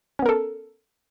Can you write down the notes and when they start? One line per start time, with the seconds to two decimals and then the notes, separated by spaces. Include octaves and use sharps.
0.19 C#4
0.22 B3
0.26 A#4
0.29 A4